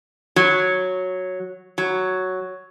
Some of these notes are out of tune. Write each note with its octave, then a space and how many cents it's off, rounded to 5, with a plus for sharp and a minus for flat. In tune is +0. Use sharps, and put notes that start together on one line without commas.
F#3 -5
F#3 +5